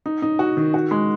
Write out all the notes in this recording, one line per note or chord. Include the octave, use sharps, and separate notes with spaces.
D#4
D#4
F#4
D#3
F#4
G#3